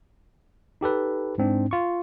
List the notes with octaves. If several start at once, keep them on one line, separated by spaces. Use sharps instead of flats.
D#4 G4 A4 B4
G#2 C4 D4
F4 C#6